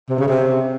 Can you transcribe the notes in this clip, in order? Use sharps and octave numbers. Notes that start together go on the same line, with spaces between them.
C3
C#3
C3